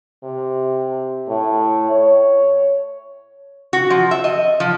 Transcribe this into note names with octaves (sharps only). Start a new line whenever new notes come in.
C3
A2
C#5
F#4
F3
E5
D#5
F3